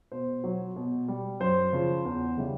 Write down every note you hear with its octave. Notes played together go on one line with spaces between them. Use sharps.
B2 C5
F#3
B2
G3
F#2 C5
C#3 F3
E2
C#3 E3 G3